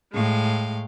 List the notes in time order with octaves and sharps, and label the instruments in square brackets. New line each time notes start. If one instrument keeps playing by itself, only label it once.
[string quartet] A2 G#3 F5 G5